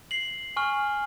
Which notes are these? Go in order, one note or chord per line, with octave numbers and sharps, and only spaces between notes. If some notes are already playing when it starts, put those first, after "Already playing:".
C7 F#7
G#5 C#6 F6